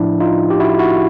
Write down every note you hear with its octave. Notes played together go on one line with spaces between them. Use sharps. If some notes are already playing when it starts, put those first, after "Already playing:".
Already playing: A2 F3 D4 E4
D#4 F4
G4
E4 F#4
E4 F#4